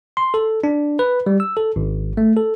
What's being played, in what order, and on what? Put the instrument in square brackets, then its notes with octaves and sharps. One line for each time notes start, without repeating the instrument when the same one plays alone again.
[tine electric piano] C6
A4
D4
B4
G3
E6
A4
G#1
A3
A4